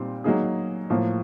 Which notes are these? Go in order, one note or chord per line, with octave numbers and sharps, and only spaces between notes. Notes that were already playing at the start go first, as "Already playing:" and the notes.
Already playing: A#2 G3 C4 D#4
F#3 A#3 D#4 G#4
A2 F3 A#3